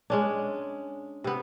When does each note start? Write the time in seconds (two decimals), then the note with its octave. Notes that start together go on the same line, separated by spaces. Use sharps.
0.10 G#3 C#4 D4
1.24 C3 B3